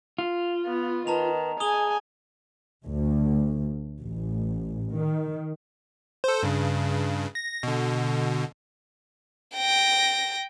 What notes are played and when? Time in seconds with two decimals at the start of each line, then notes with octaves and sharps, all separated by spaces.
0.18 F4
0.66 B3
1.07 D#3 B4 A5 A#5 F7
1.60 G#4 G#5 D#6 F7 G7
2.85 D2
4.01 A1
4.92 D#3
6.24 A4 C5
6.43 G2 C#3
7.35 A#6
7.63 B2 D3
9.56 G5 A#6